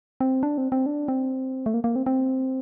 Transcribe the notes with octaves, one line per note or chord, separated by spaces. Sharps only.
C4
D4
C4
C4
D4
C4
A3
A#3
A#3
C4
C4